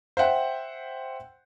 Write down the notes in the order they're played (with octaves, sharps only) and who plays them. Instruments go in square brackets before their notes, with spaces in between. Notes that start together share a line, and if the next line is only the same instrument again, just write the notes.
[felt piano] C5 E5 F#5 G5